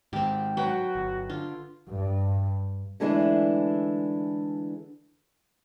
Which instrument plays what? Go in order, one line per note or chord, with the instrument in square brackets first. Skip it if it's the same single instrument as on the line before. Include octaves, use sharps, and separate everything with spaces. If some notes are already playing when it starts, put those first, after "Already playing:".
[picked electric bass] G#2 D#3 [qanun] C4 G4
[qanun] F#3 B4 G5 [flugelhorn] F#4
[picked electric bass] G1
[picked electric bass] D3 [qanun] F4
[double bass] G2
[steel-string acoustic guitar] D3 E3 G#3 A3 D4 E4